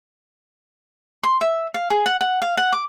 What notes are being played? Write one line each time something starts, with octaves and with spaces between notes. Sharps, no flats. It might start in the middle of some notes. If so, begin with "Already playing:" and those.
C6
E5
F5
G#4
F#5
F#5
F5
F#5
D6